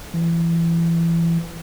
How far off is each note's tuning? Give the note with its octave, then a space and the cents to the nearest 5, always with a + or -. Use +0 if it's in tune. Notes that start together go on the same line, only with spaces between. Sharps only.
E3 +25